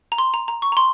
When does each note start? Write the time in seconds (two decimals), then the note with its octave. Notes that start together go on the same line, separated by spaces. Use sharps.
0.12 A#5
0.18 C6
0.34 A#5
0.48 A#5
0.62 C#6
0.72 A#5
0.77 C6